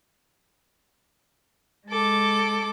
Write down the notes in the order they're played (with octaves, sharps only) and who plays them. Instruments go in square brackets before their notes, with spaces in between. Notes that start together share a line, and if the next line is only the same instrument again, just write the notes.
[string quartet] G#3 A4 D6